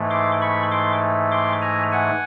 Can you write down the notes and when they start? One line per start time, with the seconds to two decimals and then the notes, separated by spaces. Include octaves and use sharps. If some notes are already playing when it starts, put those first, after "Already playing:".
Already playing: G#2 E3 A3
0.10 C6 D6
0.42 B5 C#6
0.71 C6 D6
1.31 C6 D6
1.62 G#5 A#5
1.92 F#5 G#5